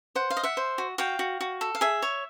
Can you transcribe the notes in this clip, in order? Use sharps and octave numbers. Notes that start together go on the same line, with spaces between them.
C5 F#5
F5
D#5
E5 F#5
C5
F#4
F#4 F5 G5
F#4
F#4
A4
F5
G#4 E5
C#5